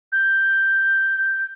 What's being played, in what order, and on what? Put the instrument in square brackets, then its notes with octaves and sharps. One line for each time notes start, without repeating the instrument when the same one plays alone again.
[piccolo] G6